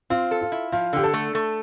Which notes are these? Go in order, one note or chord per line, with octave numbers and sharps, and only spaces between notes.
C4 F4
A4
F4
E4
F3 F4
D3 G4
A4
A3
A3